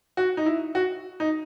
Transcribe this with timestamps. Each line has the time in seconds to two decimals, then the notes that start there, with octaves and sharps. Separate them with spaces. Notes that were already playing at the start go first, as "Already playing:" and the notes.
0.17 F#4
0.37 D#4
0.46 E4
0.75 F#4
1.20 D#4